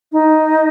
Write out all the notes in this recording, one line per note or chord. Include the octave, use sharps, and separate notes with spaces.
D#4